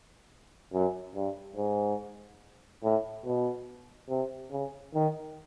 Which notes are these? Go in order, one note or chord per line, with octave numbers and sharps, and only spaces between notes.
F#2
G2
G#2
A2
B2
C3
C#3
D#3